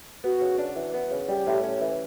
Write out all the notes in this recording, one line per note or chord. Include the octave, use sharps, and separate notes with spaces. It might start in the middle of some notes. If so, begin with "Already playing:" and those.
B3 F#4
C#3
D4
E3
B3
C#3
G3 G4
A2
C#4
E3